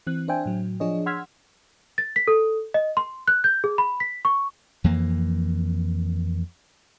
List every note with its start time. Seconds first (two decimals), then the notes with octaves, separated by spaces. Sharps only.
0.07 E3 C4 F#6
0.28 D4 C5 E5 G5 G#5
0.46 A2 F#3
0.80 F3 D4 G#4 C#5 D#5
1.06 F#5 C6 E6 F6 G#6 B6
1.98 A6
2.16 B6
2.28 A4
2.74 D#5
2.97 C6
3.28 F#6
3.44 G6
3.64 G#4
3.78 B5
4.00 B6
4.25 C#6
4.84 F2 E3 A#3